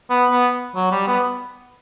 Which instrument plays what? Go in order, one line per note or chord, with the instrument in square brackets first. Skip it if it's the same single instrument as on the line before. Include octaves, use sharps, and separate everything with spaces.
[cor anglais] B3
B3
F#3
G3
B3